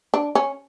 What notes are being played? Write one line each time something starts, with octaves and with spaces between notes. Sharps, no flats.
D4
C#4